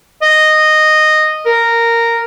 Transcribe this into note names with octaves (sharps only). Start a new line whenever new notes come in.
D#5
A#4